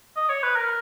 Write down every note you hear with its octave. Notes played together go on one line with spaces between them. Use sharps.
D#5
C#5
B4
A#4